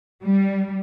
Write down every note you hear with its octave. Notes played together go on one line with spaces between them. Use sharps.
G3